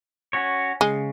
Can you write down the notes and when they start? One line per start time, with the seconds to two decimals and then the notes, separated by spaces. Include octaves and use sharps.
0.33 C#4 F#4 C#5
0.81 C#3 G#3